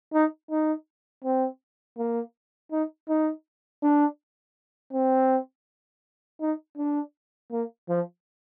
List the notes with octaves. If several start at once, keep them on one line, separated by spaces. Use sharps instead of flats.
D#4
D#4
C4
A#3
D#4
D#4
D4
C4
D#4
D4
A#3
F3